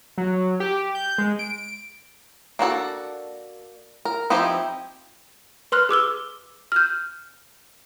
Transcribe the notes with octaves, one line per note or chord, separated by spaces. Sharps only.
F#3
G4
G6
G#3
D7
A#3 D4 F#4 A4
A#4
F3 C4 D#4 E4 G4
B4 C6 F6 F#6
G#4 D6 E6 G7
F6 G6